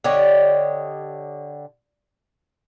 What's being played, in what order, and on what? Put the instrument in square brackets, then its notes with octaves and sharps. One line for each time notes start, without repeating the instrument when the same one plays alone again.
[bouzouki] D3 G4 C#5 D#5